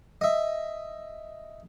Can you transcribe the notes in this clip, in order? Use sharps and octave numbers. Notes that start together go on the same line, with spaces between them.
D#5 E5